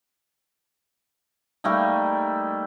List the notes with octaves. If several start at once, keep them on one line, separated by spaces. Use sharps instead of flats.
G3 A3 A#3 D#4